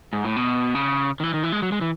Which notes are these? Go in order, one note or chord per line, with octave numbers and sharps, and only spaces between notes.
G#2
A2
B2
C#3
D#3
E3
D#3
E3
G#3
F#3
G#3
E3